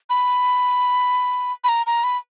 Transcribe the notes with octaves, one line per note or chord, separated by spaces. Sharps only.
B5
B5
A#5
A#5
B5